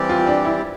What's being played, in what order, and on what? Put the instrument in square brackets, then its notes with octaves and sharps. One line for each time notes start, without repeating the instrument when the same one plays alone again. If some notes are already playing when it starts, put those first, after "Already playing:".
Already playing: [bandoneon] E3 G3 C4 G4 D5
[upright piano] F4
D4
E4